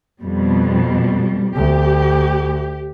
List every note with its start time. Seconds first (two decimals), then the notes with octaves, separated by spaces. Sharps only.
0.20 F2 B2 G3
1.56 D2 G4